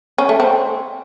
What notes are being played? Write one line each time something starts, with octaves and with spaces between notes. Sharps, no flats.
C#4
A3
C4